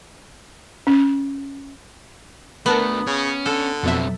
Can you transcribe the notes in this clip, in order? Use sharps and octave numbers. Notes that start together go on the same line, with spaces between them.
C#4
A3 B3 D4 A#4 A5 F#6
C#3 C#4
D3 A4
F2 B2 F#3 C4 E5